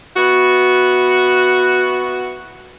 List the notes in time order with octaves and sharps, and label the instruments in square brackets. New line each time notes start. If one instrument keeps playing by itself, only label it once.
[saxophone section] B3 E4 F#4